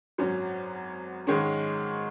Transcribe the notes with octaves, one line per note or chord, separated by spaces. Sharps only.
G#1 F#2 F#3 C#4
G#2 D#3 G#3 C#4